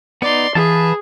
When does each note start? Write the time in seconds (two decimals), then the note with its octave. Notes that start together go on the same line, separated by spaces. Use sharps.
0.22 B3 D#4 D5 C6
0.55 E3 G#4 B4 F5 A5